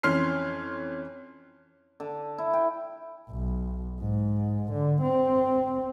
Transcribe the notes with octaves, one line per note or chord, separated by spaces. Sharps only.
F2 E3 C#4 C6 F6 C7
D3
E4
G5
B1
G#2
D3
C4